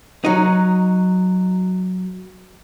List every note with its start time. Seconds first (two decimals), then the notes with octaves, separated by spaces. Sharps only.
0.25 F#3 D#4